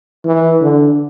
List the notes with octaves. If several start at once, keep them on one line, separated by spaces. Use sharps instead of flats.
E3
D3